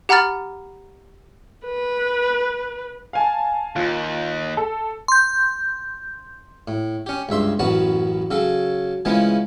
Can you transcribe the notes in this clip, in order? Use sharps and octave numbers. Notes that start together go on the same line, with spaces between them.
G4 F#5 A#5 B5 F6 A6
B4
F5 G#5 A5
D#2 F4
A4
C6 G6
A2
C#4 G4
C#2 G2 E5 C6
A1 F#2 B3 F#4 A5
C#3 F#3 A4
C#3 E3 F3 G#3 A3 B3